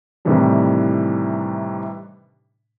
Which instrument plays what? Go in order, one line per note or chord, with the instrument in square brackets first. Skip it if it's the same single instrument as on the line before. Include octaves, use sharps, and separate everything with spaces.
[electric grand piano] A2 C3 D#3 E3 G3 D4